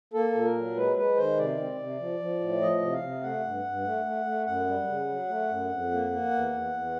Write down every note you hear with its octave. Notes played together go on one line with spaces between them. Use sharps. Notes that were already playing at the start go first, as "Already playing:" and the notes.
A#3 A4
A#2
A#4
F#3
G#3 B4
G#3 B4
D#3 C5
C3 D5
C4
C3
F3
F3
A2
F3 D#5
C3
F5
C3
A3 F#5
G2
G2
A3
A3
A3
F#2 F#5
G3
C#3
F#3
A3
F#2
F2
A#3
A#3
E2
E2
E2